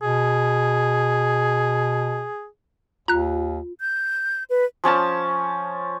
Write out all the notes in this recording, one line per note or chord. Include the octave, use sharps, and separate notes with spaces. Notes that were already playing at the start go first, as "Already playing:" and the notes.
B2 G#4
D#2 F4 A#5 F#6
G6
B4
F3 C#4 A5